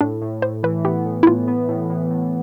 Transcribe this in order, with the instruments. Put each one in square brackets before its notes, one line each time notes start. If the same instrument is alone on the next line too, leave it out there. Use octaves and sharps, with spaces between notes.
[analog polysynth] A2 [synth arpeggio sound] D4
[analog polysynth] A2
[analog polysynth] A2 [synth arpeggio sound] C5
[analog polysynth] E3 [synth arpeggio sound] B4
[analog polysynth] B3 [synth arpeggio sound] G4
[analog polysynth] A2
[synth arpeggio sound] E4
[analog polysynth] A2 [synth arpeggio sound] F4
[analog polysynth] B3
A2
A2
A2